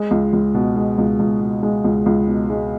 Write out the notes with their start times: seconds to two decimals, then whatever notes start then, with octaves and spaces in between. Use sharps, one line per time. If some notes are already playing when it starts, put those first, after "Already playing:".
Already playing: G#3
0.11 C#2
0.33 C#2
0.55 B2
0.76 G#3
0.98 C#2
1.19 C#2
1.41 B2
1.63 G#3
1.84 C#2
2.06 C#2
2.28 B2
2.50 G#3